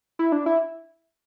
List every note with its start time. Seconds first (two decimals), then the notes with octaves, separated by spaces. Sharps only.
0.19 E4
0.32 D4
0.46 E4